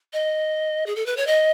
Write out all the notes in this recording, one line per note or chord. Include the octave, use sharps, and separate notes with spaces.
D#5
G#4
A4
B4
C#5
D#5